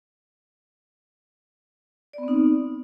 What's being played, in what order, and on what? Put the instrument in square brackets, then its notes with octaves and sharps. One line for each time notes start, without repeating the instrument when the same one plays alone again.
[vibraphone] D5
B3
C4
D#4